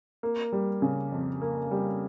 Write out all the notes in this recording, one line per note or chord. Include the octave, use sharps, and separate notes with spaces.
A#3
G3
C#3
F2
A#3
G3